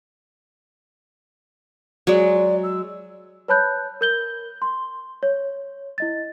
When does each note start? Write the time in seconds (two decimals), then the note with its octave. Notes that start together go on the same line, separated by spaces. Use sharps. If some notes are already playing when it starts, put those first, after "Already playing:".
2.07 F#3 G#3 D5
2.63 E6
3.48 B4 C#5 A5 B5 F#6 G6
4.01 A#4 G6 G7
4.62 C6
5.23 C#5
5.98 E4 D#5 A6